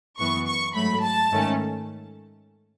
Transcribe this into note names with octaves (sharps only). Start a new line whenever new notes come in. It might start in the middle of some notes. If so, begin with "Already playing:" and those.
F#2 E3 B3 C#6
C#6
G#2 F#3 A3 B5
A5
G#2 D#3 A3 C#4